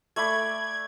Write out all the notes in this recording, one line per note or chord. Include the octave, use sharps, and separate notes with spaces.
A3 D5 B5 G#6